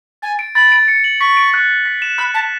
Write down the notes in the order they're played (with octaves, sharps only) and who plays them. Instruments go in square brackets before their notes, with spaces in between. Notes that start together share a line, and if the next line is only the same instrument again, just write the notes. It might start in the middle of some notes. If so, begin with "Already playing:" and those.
[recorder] G#5 [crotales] A6
[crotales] D7
[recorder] B5 [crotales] A6
[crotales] D7
C#7
F#7
[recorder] C#6 [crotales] B6
[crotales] D7
F#6
B6
B6
E7
[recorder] B5 [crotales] F#6
[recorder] A5 [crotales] B6